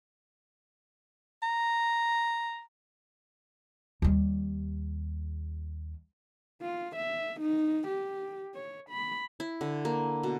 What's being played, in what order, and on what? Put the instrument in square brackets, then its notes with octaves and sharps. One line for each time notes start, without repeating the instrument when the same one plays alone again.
[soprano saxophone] A#5
[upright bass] D#2 G3
[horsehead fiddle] F4
E5
D#4
G4
C#5
B5
[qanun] E4
D3
A#3
B2